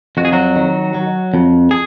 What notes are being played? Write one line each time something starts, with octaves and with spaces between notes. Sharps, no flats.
F2 F#4
G#4
F#3 F#4
D#3
F#3
F2
G#4